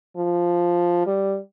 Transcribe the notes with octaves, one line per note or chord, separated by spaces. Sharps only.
F3
G3